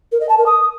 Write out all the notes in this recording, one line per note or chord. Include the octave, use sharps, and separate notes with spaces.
A#4
D#5
A5
A#4
D#6